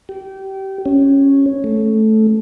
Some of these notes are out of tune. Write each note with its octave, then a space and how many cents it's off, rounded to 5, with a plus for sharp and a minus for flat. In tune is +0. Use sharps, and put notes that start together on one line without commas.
G4 -25
C#4 -5
A3 -10